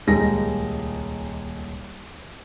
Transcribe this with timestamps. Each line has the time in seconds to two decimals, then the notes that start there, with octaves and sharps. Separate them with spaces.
0.07 D#1 C#2 G#3 D#4 A#6